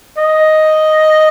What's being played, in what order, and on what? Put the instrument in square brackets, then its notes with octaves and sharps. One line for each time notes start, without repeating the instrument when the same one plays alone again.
[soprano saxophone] D#5